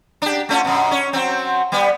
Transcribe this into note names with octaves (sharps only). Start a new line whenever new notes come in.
D4 G4
A3 C#4 F4
F#2 B2
C#4 C#5
F#3 C4
G3 B3